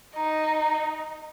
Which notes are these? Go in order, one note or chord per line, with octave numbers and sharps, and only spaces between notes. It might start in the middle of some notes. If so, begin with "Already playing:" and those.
D#4